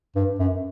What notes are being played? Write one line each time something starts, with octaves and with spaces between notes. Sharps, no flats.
G2
F#2